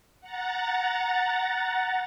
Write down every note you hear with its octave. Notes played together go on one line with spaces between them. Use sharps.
F#5 A#5 A6